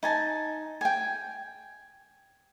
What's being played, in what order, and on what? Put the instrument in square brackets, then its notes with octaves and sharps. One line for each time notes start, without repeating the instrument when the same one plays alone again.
[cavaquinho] D#4 G#5 A5
G5 G#5